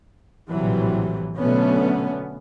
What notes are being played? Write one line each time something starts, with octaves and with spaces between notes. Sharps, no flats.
A#1 A2 C3 E3 F#3 G3
B2 D3 F#3 A3 B3 C#4